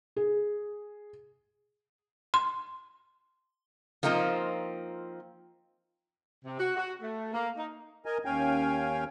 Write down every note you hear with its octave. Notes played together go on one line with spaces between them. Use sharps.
G#4
C6
F3 A#3 C4 D#4 F4
C3
F#4
F#4
A3
A#3
D#4
A#4 D#5 G#5
D#2 C#4 F5 G5 G#5